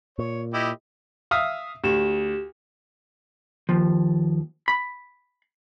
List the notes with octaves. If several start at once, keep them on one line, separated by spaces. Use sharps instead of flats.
A#2 C#5
E4 G4 D#5
E5 F5 D#6
D2 G4 E7
D#2 F3
B5